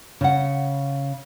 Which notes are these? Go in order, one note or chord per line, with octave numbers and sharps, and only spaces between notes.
C#3 F#5